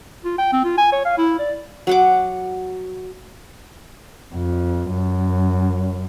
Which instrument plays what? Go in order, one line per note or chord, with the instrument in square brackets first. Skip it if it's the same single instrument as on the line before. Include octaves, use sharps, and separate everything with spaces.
[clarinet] F4
G5
C4
F4
G#5
C#5
F5
E4
D5
[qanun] F#3 F#5 D6
[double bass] F2
F#2